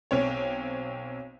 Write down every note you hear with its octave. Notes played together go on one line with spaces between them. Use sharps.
B1 C4 C#5